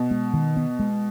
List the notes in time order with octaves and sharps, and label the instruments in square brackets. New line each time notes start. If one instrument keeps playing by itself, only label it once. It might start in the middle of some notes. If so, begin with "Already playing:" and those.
Already playing: [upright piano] B2
[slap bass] G#3
D#3
B3
G#3